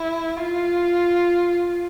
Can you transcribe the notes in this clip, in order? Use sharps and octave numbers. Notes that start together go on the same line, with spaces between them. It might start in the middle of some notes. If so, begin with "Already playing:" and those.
Already playing: E4
F4